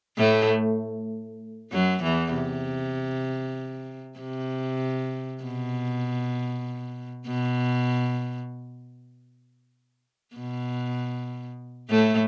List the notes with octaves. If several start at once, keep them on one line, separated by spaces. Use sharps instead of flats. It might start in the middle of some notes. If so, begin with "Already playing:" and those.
A2 A3
F#2 F#3
E2 E3
C3
C3
B2
B2
B2
A2 A3